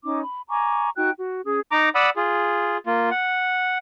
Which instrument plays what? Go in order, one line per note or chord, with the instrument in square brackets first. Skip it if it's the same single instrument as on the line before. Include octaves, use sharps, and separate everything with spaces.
[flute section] C#4 D#4 D6
B5
G#5 A#5 C#6 D6
D#4 F#4 G5 F#6
F#4
C#4 G#4 D#6
[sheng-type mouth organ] D#4 A#5 D6
D5 F#5 B5 D#6 E6
F4 G#4
A#3 F4
F#5